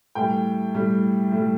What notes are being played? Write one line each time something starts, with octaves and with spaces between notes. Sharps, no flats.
A2 G3 G5
A2 G3
A2 G3